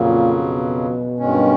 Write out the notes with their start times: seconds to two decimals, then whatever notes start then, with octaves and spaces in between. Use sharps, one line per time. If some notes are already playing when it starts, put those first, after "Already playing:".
Already playing: F2 A#2 C#3 F#3
0.39 B2
1.19 G2 D#3 G#3 C#4